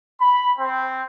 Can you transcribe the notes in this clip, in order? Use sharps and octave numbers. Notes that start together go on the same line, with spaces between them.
B5
C4